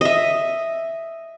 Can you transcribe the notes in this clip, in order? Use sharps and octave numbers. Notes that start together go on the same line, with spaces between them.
D#5 E5